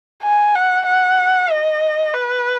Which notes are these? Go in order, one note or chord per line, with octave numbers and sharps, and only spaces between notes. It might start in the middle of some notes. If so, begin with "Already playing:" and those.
G#5
F#5
F#5
D#5
B4